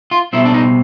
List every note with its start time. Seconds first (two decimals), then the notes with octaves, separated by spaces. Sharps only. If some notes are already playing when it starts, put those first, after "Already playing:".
0.11 F4
0.33 B2 G3 C4 E4
0.45 D4
0.54 D#4